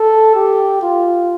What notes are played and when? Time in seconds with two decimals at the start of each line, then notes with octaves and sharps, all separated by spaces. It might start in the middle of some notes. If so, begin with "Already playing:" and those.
Already playing: A4
0.35 G4
0.82 F4